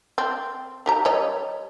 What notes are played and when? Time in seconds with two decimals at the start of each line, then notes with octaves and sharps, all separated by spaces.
0.18 C4
0.86 D#3 G4 A#5
1.05 G3 C#5 D#5